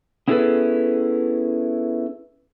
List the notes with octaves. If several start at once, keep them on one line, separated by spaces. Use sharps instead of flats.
B3 C#4 E4 G#4 A4 B4